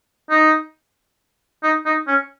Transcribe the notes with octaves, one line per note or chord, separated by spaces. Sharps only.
D#4
D#4
D#4
C#4